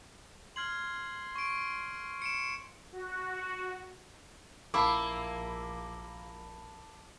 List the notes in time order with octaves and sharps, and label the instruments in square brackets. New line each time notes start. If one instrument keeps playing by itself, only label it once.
[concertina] C6 [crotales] F6 G#6 F#7
[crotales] C#6 D7
C#7 D7 E7
[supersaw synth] F#4
[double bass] A#1 [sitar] A#3 [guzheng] E4 [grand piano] A5 B5 D6